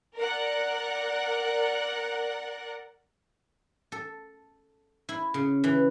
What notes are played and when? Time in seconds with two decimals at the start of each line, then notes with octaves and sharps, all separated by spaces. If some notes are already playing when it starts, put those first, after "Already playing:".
0.15 A#4 D5 F#5
3.92 A4
5.09 E4
5.34 C#3
5.64 E3